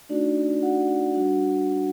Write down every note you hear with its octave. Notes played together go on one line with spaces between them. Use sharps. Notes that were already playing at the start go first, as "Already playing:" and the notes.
A3 D4 D#4 F#4 D5
F#4 F#5
G3 D4 F#4